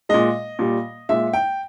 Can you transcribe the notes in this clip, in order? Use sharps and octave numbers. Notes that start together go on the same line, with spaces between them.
A#2 G#3 D#5
A#2 G3
A#2 G#3 E5
G5